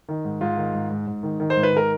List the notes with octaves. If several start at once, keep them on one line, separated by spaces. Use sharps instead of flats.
D#3
G#2
G#2 F4
D#3
G#2
G#2
G#2
D#3
D#3
C5
G#2
B4
D#3 A#4